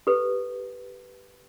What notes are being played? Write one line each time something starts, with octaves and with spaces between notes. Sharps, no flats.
G4 A4 B4